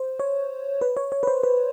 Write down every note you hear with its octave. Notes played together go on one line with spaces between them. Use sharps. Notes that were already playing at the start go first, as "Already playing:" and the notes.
Already playing: C5
C#5
B4
C#5
C#5
B4
C5
B4